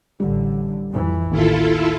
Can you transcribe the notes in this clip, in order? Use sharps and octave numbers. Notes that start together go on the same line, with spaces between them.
A1 D3 G3
F2 E3
A1 D#2 E4 F4 A4